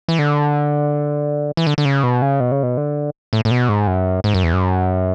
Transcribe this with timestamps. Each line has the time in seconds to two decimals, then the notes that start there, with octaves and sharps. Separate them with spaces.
0.08 E3
0.19 D3
1.57 E3
1.67 D3
1.78 D3
1.85 C#3
2.03 B2
2.22 C#3
2.40 B2
2.52 C#3
2.63 B2
2.77 D3
3.33 A2
3.45 A2
3.51 B2
3.69 G#2
3.87 F#2
4.24 G#2
4.34 F#2
4.44 E2
4.53 F#2